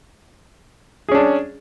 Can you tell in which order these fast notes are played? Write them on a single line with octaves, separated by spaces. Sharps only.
G#4 C#4 D4